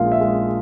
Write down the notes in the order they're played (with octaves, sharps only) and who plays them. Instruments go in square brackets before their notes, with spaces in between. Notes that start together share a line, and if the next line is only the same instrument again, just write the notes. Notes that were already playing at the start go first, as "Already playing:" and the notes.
Already playing: [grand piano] A#1 A#2 G#3 F5
E5
G#3